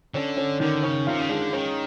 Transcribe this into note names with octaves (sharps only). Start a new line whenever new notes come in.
D3 C#4
C#4
D3 D#3
C#3 C#4
C3 F4
C#3
D3 G#3
D#3 C#4